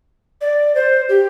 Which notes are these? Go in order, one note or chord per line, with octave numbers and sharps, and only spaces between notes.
D5
C5
G4